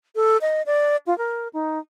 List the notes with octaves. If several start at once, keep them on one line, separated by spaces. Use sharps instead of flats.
A4
D#5
D5
F4
A#4
D#4